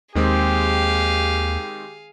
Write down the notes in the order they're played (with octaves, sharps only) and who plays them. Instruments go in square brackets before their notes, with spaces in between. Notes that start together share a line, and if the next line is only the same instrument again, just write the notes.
[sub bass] D#2 [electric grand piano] D#3 G#3 C4 [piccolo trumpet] G4 [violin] G#4 F5